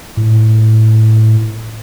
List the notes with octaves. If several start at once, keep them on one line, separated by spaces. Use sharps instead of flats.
A2